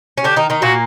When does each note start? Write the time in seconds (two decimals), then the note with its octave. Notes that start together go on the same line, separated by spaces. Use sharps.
0.18 C#4
0.24 D3 D4 G4
0.36 D#3 D#4
0.50 D#3 D#4
0.62 A#2 A#3 F#4